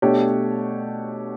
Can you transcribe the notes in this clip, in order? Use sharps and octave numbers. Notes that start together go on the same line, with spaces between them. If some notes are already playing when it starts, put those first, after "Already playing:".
B2 A3 D4 G4 C#5